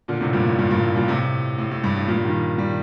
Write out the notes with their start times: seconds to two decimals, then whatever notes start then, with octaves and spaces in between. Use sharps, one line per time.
0.08 A#2 D3
0.21 A2 C3
0.33 G2 A#2
0.46 A2
0.58 G2 A#2
0.71 G2 A#2
0.83 A2
0.96 G2 A#2
1.08 A2 C3
1.58 A2
1.71 A2
1.84 G2
1.96 A2
2.08 G2 A#2
2.25 D#3 G3
2.58 D#3 G3